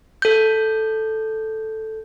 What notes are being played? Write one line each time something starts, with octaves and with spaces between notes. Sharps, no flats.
A4 G6